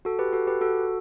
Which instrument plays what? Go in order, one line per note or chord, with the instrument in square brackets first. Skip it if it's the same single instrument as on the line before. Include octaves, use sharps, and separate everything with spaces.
[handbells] F#4 A4
G4 B4
F#4 A4
G4 B4
F#4 A4